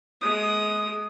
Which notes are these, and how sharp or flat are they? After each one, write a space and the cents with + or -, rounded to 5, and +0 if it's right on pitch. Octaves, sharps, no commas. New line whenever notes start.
G#3 +30 D#6 +0